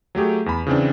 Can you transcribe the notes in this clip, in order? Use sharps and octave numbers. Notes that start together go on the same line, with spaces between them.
F#3 A3 G4 G#4
E2 B5
C#3 E3 C4 D4